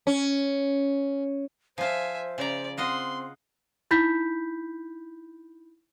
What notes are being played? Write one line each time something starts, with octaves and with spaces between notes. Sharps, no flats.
C#4
F3 F4 C5 E5 G#5
C#3 D5 A#5
C4 F4 D#5 F#5 C6
D#4 E4 B5 G6 B6